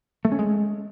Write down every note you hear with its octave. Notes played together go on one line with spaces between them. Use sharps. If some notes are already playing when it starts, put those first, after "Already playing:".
A3
C#4
G#3